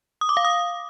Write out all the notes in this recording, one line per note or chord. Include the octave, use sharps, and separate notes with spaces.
D#6
D6
F5
D#6